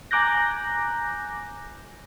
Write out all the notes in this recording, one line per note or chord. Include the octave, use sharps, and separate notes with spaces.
G#5 A#5 D6 F#6 G6 A#6